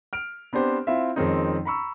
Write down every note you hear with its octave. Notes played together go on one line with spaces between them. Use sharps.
F6 D7
B3 C4 D4 G4 C5
C4 E4 F4 E5
F2 D#3 G#3 C4 C#4 D#4
A#5 B5 C#6 E6